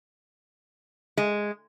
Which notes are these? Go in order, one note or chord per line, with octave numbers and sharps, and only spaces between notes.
G#3